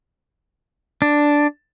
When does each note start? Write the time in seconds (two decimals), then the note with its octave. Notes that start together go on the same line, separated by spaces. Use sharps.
1.02 D4